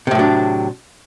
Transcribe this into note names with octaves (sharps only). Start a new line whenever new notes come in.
A2 C3 F#3 D4